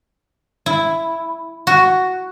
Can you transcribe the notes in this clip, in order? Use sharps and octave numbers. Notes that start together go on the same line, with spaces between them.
E4
F#4